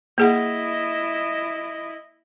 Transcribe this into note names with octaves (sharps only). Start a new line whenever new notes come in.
A#3 E4 G#4 D#5 F#5